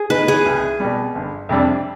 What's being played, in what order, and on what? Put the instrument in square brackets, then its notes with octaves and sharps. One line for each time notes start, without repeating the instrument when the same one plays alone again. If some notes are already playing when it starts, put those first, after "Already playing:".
Already playing: [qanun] G#4
[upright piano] B3 D#4 [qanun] B4
[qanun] G#4
[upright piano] C2
B2 G3
G1
F2 C3 G3 D4